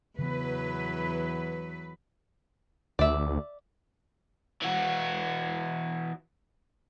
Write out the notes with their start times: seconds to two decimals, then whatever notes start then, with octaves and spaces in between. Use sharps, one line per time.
0.19 E2 C#3 E3 F#3 B3 B4
2.99 D2 D5 E5
4.62 E3 F#4